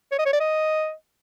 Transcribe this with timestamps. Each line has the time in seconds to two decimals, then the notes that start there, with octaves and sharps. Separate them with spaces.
0.11 C#5
0.18 D#5
0.26 C#5
0.33 D5
0.40 D#5